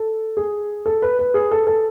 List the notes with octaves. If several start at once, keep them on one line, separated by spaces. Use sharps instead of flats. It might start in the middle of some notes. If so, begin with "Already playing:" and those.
Already playing: A4
G#4
A4
B4
B4
G#4
A4
A4